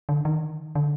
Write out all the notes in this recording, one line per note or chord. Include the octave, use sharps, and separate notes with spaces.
D3
D#3
D3